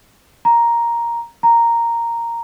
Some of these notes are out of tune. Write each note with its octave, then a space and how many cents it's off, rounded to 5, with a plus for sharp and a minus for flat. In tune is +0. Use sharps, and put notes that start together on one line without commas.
A#5 +5
A#5 -5